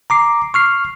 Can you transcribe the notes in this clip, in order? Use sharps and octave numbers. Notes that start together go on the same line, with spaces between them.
A#5 D6 C7
C#6 F6 C7